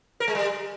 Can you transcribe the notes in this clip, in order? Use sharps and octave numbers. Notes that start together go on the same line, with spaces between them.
A#4
G#3
G3